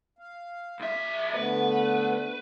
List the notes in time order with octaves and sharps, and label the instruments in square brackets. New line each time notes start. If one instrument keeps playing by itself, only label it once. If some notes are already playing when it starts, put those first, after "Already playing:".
[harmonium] F5
[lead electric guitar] B1 E5
[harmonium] D3 A3 B3 [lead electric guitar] B4